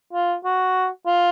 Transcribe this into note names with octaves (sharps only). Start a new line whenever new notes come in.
F4
F#4
F4